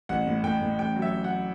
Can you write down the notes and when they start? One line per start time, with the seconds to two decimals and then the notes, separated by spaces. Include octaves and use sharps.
0.09 A1 F#5
0.26 A2
0.43 A2 G5
0.61 A2
0.79 A1 G5
0.96 F#3
1.02 E5
1.13 F#3
1.24 F#5